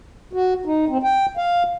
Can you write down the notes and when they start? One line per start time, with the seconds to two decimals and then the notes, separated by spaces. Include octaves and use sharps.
0.33 F#4
0.66 D#4
0.88 C4
1.03 G5
1.37 F5